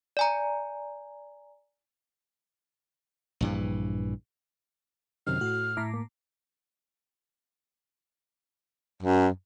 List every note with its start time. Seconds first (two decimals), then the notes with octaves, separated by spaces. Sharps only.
0.17 D5 G#5 A#5
3.41 A#1 G2 E3
5.27 F#2 C3 D#3 F6
5.41 A2 F#4
5.77 A2 E4 A#5 D6
5.94 A#3
9.03 F#2